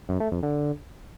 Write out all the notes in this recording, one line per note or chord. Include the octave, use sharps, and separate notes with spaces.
F#2
A3
F2
D3